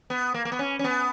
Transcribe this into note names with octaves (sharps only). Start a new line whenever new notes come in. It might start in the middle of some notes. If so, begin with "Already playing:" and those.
B3
A#3
A#3
B3
C#4
C#4
B3